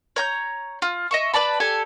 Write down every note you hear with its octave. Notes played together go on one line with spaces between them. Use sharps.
C#5 A#5 G6
F4
D#5 E5 C#6
B4 D5 A5 B5
G4 A4 G#5